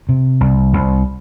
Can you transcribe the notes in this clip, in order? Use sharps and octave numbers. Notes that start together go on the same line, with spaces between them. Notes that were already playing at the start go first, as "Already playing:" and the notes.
C3
C2
C2